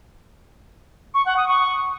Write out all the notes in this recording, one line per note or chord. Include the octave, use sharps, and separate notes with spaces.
C#6
F#5
D#6
C#6